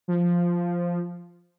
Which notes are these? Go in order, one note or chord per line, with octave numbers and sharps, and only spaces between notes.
F3